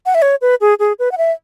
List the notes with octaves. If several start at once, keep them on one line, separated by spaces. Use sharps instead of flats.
F#5
E5
C#5
B4
G#4
G#4
B4
F#5
E5